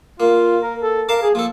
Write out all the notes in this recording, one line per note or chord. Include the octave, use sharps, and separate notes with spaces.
A#3 F4
A#4
A4
A#4 F5 A5 D6
G#4
F3 A#3 A4